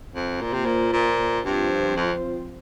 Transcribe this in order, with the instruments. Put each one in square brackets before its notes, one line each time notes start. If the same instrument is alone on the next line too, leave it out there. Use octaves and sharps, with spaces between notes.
[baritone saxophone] F2
[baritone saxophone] A#2 [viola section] A#3 F4 C5
[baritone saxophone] C3
A#2
A#2
[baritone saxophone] G2 [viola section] F3 C4 F4 C5
[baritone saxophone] F2